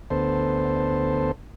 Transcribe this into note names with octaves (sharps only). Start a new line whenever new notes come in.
D2 B3 A4 C5